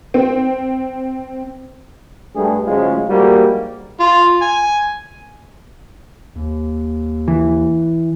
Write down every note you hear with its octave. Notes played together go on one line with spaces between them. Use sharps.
C4
G2 A3 G#4
D2 G#2 F#3 G#3 C#4 F4
A#1 G#2 G3 G#3 A#3 F#4
F4
G#5
D#2
E3